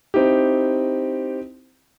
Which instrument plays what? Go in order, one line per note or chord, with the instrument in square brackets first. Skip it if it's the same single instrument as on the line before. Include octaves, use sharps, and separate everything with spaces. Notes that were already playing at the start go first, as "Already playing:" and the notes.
[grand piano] C4 D#4 E4 G4